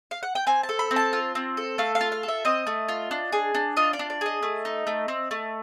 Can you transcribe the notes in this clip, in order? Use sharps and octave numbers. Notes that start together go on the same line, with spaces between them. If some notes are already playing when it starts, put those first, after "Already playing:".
F5
F#5
G5
C4 G#5
A5
A4
B5
C4
A5
F4
C4
A4
A3 F5
F5
F4
F5
A4
E5
C4 D#5
A3
F4
D4
G#4
D4
F4 D#5
D5
D4
D5
G#4 D#5
A3
D#4
A3
C4
A3